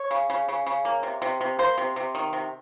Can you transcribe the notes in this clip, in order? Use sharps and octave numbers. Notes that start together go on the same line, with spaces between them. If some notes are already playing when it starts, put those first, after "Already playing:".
Already playing: C#5
C#3
C#3
C#3
C#3
A#3
C3
C3
C3
A#3 C5
C3
C3
D#3
C3